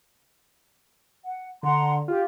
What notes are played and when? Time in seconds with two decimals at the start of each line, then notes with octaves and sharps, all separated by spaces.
1.25 F#5
1.63 D3 F#5 A#5 C6
2.08 F4 G4